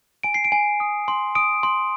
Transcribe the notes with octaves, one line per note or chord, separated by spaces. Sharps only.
G#5 D7
C7
D7
G#5
D#6
C6
D#6 D7
C6